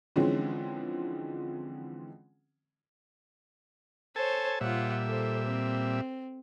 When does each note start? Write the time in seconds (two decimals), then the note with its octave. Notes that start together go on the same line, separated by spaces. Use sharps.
0.16 D3 E3 F3 G#3 C4 C#4
4.16 A4 C5 C#5 G#5 A5
4.61 A#2 G3 F4 E5 F#5
5.05 A4 C5
5.44 C4